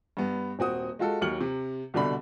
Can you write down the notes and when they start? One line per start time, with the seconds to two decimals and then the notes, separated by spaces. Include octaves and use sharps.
0.17 G2 B3
0.59 D#1 C4 F#4 D#6
0.99 G#3 F4 F#4 A4
1.22 D#2 F#3 F6 C#7 F#7
1.41 C3
1.94 C2 B2 D3 D4 B5